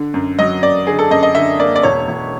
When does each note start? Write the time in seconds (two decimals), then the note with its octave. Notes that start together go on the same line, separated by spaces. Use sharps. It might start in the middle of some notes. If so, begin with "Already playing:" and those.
Already playing: D3
0.14 F#2
0.38 F#3 D#5
0.62 F#2 D5
0.87 D3 G#4
0.99 A4
1.11 F#2 D#5
1.23 D#5
1.35 D3 E5
1.59 A#3 D5
1.76 D5
1.83 E1 C#5
2.08 E1